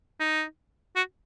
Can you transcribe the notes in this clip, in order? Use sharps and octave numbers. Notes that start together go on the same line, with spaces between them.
D#4
F#4